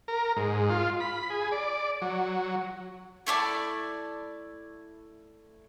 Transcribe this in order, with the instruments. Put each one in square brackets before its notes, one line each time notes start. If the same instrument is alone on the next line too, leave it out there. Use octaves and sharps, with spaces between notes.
[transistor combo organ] A#4
G#2
F4
B5
G#4
D5
F#3
[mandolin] A3 E4 D5 A5